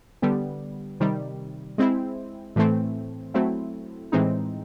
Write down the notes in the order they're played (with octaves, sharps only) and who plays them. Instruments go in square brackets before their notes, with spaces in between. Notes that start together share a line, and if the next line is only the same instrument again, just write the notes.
[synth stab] D3 G3 B3
C3 D#3 G3
G#3 C4 E4
A2 E3 A3 C4
F#3 A3 C4 E4
A2 E3 G#3 C4 D#4